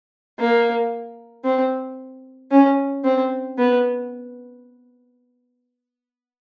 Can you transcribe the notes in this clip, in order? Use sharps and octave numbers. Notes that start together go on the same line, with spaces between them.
A#3
C4
C#4
C4
B3